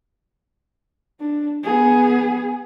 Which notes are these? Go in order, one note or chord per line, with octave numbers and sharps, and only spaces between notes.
D4
B3 G#4